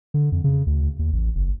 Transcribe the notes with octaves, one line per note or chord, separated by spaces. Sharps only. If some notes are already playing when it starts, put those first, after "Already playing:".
D3
F2
C#3
D2
D#2
A1
F#1